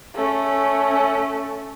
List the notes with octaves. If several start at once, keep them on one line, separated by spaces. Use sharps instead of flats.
A3 C#4